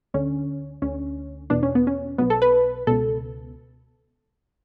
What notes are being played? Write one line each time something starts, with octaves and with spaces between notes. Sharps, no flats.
D2 D3 C#4
D2 D3 C#4
E2 B2 D4
C#4
B3
C#4
B1 B2 B3
A4
B4
C#2 B2 A4